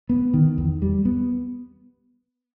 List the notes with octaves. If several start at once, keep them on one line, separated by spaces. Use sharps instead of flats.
B3
D#3
E2
G3
B3